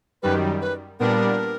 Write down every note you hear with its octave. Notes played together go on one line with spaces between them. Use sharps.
F#2 D#3 G3 B4
B4
A#2 G3 B3 D4 A#4